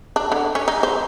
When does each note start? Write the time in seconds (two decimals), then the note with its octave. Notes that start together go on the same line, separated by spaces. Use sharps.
0.16 D4
0.32 D3
0.55 C#4
0.68 D#4
0.83 C5